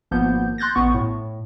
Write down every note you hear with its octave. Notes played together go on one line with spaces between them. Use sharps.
G#1 F3 A#3 B3 G6
C6 F#6 G6 A6 A#6
A1 B3 C#6
A2